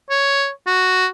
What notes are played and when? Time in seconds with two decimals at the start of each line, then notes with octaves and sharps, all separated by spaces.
0.10 C#5
0.67 F#4